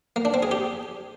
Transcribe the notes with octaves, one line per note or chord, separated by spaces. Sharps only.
A#3
D4
C4
G#4
G4